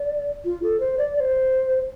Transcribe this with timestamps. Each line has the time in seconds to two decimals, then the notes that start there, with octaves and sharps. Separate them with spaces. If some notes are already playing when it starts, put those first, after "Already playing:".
Already playing: D5
0.45 F4
0.63 A4
0.80 C5
0.98 D5
1.16 D5
1.20 C5